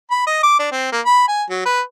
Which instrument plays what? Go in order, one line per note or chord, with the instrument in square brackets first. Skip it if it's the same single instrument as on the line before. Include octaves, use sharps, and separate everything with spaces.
[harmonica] B5
D#5
D6
D4
C4
A#3
B5
G#5
F#3
B4